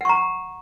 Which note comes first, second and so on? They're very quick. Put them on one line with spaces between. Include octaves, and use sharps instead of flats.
F#5 C#6 A#5